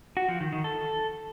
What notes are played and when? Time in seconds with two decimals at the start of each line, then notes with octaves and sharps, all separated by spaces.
0.17 F#4
0.29 F3
0.40 D#3
0.52 D#3
0.64 A4